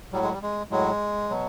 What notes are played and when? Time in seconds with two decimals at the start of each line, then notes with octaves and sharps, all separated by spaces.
0.12 A2 F#3 G3
0.23 G#3
0.32 G3
0.42 G#3
0.71 A2 F#3 G#3
1.29 B2 F#3